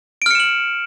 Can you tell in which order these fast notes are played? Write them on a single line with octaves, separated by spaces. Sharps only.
D7 F6 C#7 E7 F#7